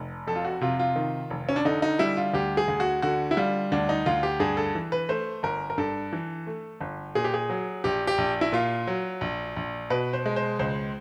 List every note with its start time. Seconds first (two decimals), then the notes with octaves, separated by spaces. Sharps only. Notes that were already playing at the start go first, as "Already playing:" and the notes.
Already playing: F1
0.27 F2 A4
0.36 F4
0.45 F#4
0.61 C3 F4
0.79 F4
0.96 D#3
1.30 F1
1.49 C#4
1.56 D4
1.65 D3 D#4
1.82 D#4
1.99 G3 E4
2.17 F4
2.34 D2 G4
2.57 G#4
2.68 D2
2.80 F#4
3.02 D3 F#4
3.31 E4
3.37 G3 F4
3.72 D2 D4
3.89 D#4
4.06 D2 F4
4.23 G4
4.40 G2 G#4
4.57 A4
4.75 E3
4.92 B4
5.09 A3 C5
5.43 G1 A#4
5.70 A#4
5.78 G2 A4
6.13 E3
6.47 A3
6.81 G1
7.15 A#2 G#4
7.24 G4
7.34 G#4
7.50 F#3
7.84 A#1 G4
8.07 G4
8.18 A#1
8.41 E4
8.52 A#2 F4
8.87 F#3
9.21 A#1
9.56 A#1
9.90 B2 B4
10.13 C5
10.26 G#3
10.36 C5
10.59 C#2 C5